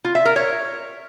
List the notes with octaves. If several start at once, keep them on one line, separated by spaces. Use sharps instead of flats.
F4
E5
A#4
C#5